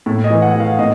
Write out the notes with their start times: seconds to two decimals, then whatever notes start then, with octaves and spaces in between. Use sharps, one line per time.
0.06 A2
0.24 D#5
0.30 E3
0.42 F#5
0.55 E3
0.60 F5
0.79 A2 D#5